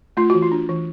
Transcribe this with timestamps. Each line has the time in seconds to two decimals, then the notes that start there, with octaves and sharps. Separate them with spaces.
0.17 A3 F4
0.30 E3 F#4
0.42 F4
0.52 D4
0.69 E3